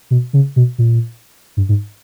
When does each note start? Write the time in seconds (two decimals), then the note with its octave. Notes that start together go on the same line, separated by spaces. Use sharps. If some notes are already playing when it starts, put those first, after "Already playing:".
0.11 B2
0.33 C#3
0.56 B2
0.78 A#2
1.57 G2
1.69 G#2